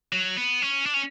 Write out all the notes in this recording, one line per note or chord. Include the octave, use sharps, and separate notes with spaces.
F#3
B3
C#4
D4
C#4